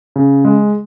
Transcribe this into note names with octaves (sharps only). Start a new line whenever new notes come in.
C#3
G#3